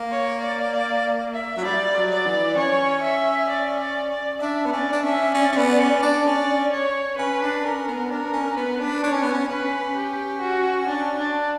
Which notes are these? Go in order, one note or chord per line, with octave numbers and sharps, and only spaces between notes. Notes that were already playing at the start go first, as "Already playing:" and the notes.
Already playing: A#3
C#5
D5
D5
E5
F#3
G3 D5
F#3
D5
E3
C#4 C#5
E5
D5
D5
D5
D4 E5
B3
C#4 D5
D4
C#4 E5
C#4 D5
C#4
B3
C#4
D4
C#4 D5
C#5
C#4 B4
D4
C#4 A#4
B3
D4 A#4
C#4
B3 B4
D4
D4 C#5
C#4
B3
C#4
C#4 B4
G4
F#4
D4
D4